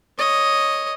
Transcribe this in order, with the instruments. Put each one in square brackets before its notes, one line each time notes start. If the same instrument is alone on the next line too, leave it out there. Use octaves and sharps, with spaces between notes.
[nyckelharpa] C#5 D#5